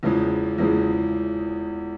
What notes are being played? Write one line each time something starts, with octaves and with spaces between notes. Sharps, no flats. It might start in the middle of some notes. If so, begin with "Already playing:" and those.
E2 C#3 F3 G#3
E2 C#3 F3 G#3